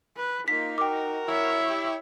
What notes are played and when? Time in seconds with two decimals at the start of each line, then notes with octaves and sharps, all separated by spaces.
0.17 B4
0.48 A#3 D#4 F4 B6
0.78 F#4 A#4 G5 D6
1.28 E4 C#5 E5
1.67 G4